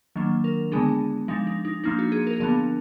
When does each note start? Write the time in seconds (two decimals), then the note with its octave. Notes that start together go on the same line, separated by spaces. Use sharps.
0.16 D#3 F#3 A#3 D4
0.44 A#4
0.72 D3 G#3 B3 D4 G#4
1.28 F3 G#3 D4 D#4
1.47 D#4
1.65 D#4
1.84 F3 A#3 D4 D#4
1.99 F#4
2.12 G#4
2.27 A#4
2.33 G#4
2.40 D3 F3 B3 D4 A#4